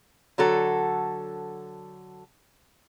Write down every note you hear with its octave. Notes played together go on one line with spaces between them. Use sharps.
D3 F#3 F#4 A4